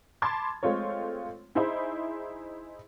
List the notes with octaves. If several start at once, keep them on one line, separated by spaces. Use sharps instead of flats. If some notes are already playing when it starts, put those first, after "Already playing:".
A5 B5 C6 D6 G#6 A6
G#3 A3 C4 F4 C#5
D#4 E4 G#4 C5 E5 B5